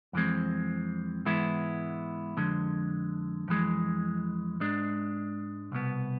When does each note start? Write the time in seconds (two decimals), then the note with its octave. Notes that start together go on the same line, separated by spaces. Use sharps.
0.13 F2 E3 G#3 C4
1.25 G#2 E3 G#3 B3 E4
2.37 F2 D3 G#3
3.48 F2 E3 G#3
4.60 G#2 G#3 D4
5.72 C2 B2 B3